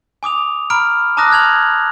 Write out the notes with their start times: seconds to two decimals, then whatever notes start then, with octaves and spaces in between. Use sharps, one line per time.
0.23 G#5 D6 D#6 F7
0.70 A#5 B5 F6 D7
1.17 A5 A#5 D6 D#6 F#6 A#6
1.31 F6 G#6 F7 F#7